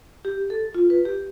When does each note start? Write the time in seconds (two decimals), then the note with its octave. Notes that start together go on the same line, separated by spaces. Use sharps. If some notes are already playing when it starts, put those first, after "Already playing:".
0.25 G4
0.50 A4
0.75 F4
0.90 B4
1.05 G4